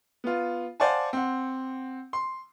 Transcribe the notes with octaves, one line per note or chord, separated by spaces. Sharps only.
B3 F4
C5 D5 F5 F#5 G#5 A5
C4 F#5
C6